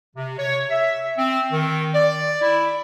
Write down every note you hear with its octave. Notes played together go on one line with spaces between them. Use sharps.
C3
C#5
E5
C4
D#3
D5
E4